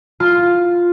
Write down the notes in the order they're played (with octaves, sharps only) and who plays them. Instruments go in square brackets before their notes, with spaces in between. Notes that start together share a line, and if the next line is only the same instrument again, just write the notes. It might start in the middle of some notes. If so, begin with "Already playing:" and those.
[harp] F4